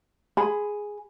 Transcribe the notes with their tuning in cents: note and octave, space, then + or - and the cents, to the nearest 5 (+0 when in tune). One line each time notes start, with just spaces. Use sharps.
G#4 +0 B5 +15